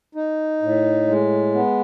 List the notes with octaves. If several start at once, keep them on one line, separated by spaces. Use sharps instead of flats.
D#4
A2
G#3
B3